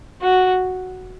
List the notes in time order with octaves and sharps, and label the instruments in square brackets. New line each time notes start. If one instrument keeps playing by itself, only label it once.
[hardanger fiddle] F#4